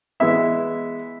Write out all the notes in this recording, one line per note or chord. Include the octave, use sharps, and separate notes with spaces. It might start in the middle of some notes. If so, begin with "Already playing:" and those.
E3 G#3 B3 E4 E5